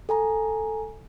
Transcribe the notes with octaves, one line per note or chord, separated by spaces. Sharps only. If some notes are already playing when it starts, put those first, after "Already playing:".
A4 G#5 A#5